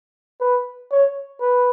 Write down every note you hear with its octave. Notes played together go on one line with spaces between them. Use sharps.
B4
C#5
B4